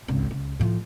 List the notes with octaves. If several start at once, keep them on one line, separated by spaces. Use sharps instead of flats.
G#1 C#2
C#2
A2 F3